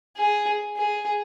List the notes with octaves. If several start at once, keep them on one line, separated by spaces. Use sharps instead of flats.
G#4
G#4